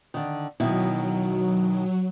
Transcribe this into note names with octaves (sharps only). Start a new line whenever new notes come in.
D3 D#3
B2 D#3 F#3 E4